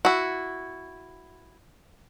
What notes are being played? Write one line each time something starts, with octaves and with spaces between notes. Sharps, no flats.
E4 F#4